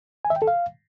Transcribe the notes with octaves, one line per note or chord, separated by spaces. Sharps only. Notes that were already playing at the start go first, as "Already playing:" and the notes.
G#5
E5
G5
A4
F5